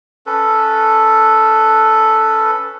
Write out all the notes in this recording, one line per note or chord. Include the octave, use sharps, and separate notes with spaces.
C#4 A4 B4